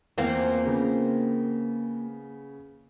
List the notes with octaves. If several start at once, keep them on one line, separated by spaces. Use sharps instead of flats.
E2 A#3 C4 F4
C#3 B3